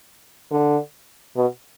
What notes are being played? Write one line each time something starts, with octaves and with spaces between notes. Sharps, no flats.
D3
B2